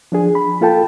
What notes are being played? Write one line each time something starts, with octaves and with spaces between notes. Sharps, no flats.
F3 D4 G#4
B5
A#3 F4 A4 G5 A5